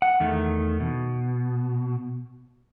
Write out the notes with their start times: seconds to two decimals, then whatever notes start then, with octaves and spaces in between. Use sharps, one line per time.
0.02 F#5
0.20 E2 D#3 A3
0.80 B2